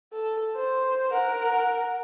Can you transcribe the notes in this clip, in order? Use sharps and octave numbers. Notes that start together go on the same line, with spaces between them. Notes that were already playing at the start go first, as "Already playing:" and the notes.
A4
C5
A#4 F#5